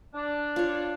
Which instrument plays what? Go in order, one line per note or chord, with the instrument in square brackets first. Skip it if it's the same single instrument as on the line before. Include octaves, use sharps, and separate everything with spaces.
[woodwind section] D4
[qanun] F4 C#5